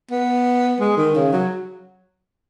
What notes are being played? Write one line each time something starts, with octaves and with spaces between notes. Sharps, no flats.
B3
G#3
D#3
C#3
F#3